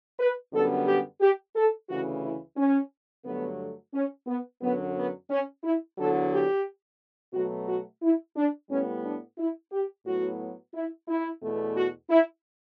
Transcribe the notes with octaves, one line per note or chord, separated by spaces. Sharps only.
B4
F#2 D3 G3 B3 A4
G4
G4
A4
D2 C#3 E3 F#4
E4
C#4
G2 D3 F#3 A3 B3
C#4
B3
F#2 D3 F#3 B3
B3
C#4
E4
E2 D3 F#3 A4
G4
B2 F#3 A3 F#4
F#4
E4
D4
A2 G3 B3 C#4
D4
E4
G4
A2 F#3 B3 F#4
E4
E4
E2 B2 A3
F#4
E4